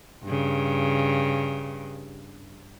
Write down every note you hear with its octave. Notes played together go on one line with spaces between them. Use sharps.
G2 C#3